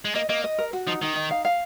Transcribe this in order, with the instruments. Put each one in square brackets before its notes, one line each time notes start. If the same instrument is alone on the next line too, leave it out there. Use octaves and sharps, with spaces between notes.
[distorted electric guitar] G#3
[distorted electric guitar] A#3 [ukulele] D#5
[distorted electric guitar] A#3 [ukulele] D#5
[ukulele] D#5
A#4
F#4
[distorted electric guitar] F3 [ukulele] D#4
[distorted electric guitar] D#3 [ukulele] D#4
[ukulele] D#4
F5
F5